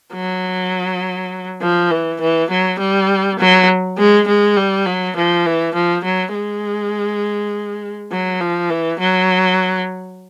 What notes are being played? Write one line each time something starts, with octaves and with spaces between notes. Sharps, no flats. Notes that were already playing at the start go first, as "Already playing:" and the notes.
F#3
F3
E3
E3
F#3
G3
F#3
G#3
G#3
G3
F#3
F3
E3
F3
F#3
G#3
F#3
F3
E3
F#3